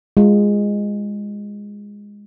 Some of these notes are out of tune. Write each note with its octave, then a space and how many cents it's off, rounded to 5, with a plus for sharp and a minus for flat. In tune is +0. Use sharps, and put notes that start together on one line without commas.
G#3 -15 F4 +0